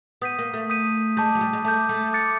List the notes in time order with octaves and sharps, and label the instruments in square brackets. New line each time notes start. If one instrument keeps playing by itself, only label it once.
[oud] B3 [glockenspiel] D#6 G6 B6 D#7
[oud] A#3
A3
[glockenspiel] D#6 G6 B6 D#7
[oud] G#3 [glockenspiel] A5 D6 G6
[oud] F#3
G3
G#3
[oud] A3 [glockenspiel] A5 D6 G6
[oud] A3
[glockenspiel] D6 F#6 A6 C#7